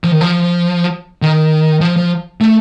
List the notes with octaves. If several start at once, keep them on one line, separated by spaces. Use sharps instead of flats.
F3
D#3
F3
D#3
F3
F3
A3